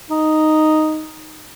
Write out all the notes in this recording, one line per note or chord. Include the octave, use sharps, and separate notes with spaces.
D#4